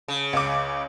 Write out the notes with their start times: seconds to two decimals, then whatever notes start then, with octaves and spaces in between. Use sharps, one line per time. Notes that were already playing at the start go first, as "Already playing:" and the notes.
0.08 C#3
0.33 C#2 D6